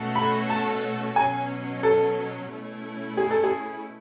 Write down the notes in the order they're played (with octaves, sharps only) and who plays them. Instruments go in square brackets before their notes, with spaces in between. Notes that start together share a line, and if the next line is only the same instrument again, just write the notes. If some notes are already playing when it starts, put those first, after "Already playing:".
Already playing: [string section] B2 A3 C#4 F#4 A4
[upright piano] B5
A5
[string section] B2 F#3 C#4 [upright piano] G#5
[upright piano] A4
[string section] B2 A3 C#4 E4
[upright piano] G#4
A4
G#4